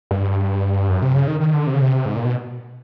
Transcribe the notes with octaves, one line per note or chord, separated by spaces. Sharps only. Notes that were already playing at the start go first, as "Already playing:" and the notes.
G2
F#2
C3
C#3
D#3
D#3
D3
C3
C#3
C3
G#2
A#2
B2